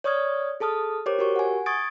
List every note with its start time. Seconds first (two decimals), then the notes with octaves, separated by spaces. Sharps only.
0.04 C#5 D5 C#6 D#6 F6 G#6
0.60 G#4 A4 A5 D#6 F6
1.06 G4 A#4 C5 C#5 D6
1.19 F#4 G4 A#4 C#6
1.36 F#5 G#5
1.66 C#6 D#6 G#6 A6 D7